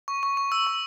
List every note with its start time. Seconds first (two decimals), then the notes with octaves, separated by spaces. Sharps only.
0.08 C#6
0.23 C#6
0.37 C#6
0.52 E6
0.67 C#6